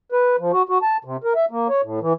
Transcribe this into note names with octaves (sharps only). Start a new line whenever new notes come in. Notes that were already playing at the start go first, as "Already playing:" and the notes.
B4
F3
F#4
F#4
A5
C3
A#4
E5
A#3
C#5
A2
E3